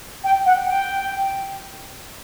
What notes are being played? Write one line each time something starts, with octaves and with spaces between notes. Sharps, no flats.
G5
F#5
G5